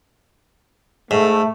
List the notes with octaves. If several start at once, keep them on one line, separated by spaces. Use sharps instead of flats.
G#2 A3